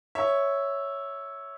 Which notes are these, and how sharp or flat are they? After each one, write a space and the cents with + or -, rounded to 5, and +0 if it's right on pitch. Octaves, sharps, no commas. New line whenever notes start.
C#5 +0 E5 -5